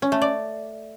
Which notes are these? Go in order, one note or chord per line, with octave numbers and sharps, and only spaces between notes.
C#4
A3
D5